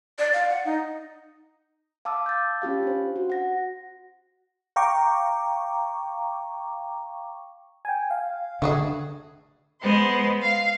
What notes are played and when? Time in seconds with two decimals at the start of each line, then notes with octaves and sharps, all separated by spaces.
0.19 D5
0.33 F5
0.50 F#5
0.65 D#4
2.05 F5 A5 D6 E6
2.26 G6 A6
2.62 C#4 F4 G4 F5
2.83 D4 C5
3.16 F#4
3.30 F#5 A#6
4.76 F5 G5 A#5 C#6 D6
7.85 G5 G#5
8.10 F5
8.62 D3 A3 F#4 G#4
9.80 G#3 B3 C5
10.41 F5